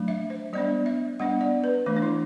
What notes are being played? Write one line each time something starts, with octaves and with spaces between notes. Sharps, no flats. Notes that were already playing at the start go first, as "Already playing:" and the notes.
Already playing: F#3 A3 D4
E5
C5
G3 B3 D4 D5
E5
G3 B3 D4 F#5
D5
B4
E3 A3 D4
D4
E4